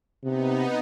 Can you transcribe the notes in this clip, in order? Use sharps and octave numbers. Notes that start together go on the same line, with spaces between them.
C3 B3 D#4